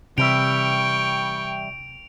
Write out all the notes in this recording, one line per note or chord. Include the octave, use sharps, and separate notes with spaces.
C3 E3 G3 E4 G5 C#6 D7 F7